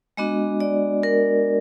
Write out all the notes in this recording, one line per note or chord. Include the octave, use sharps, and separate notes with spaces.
G#3 B3 D4 F#4 D#5
D5
A#4